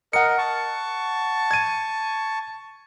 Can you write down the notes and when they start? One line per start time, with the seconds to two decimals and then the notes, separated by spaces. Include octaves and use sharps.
0.13 A#4 D#5 F#5 C#7
0.38 A5 C#6
1.51 G#6 D#7